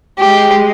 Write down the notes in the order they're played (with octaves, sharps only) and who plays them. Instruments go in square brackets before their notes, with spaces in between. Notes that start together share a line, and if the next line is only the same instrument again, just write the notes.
[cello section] G#3 [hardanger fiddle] G4